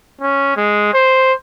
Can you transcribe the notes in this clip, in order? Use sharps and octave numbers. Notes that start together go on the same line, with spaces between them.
C#4
G#3
C5